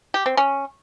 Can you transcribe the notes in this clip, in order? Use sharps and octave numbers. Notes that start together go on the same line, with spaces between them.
G4
C4
C#4